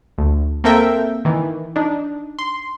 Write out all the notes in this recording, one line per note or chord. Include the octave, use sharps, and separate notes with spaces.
D2
A#3 C4 A4 A#4 E5 G5
D#3 E3
D4 D#4
C6